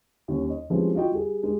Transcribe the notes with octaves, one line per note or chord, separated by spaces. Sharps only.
D#2 G3 C#4
D#5
E3 F3 G3 G#3 C4 C#4
F4 F#4 D#5 G5
G3 G#4
G#3 G4